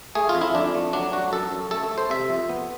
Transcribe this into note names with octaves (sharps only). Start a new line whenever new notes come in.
A3 G#4
F4
F2
E4
F2 D4
A3
F#3 D4
F#3 F#4
F#2 A4
F#2
A3 A4
A3
C5
C3 E5
F2
B3